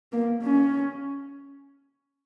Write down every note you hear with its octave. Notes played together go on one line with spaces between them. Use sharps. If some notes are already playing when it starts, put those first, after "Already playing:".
A#3
C#4